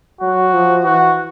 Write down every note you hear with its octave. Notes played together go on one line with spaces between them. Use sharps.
F#3 F#4
F3
E3 F#4